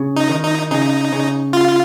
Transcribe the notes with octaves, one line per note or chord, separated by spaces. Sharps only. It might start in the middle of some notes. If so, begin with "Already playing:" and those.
Already playing: C#3
D#4
D#3
D#4
C#3 D#4
C#3
F4